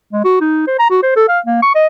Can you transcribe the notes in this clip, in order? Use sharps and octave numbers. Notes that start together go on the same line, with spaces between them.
G#3
F#4
D#4
C5
A#5
F#4
C5
A4
F5
A#3
C#6
D#5